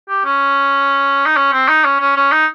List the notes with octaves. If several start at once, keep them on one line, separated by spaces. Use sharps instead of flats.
G4
C#4
D#4
C#4
C4
D#4
C#4
C#4
C#4
D#4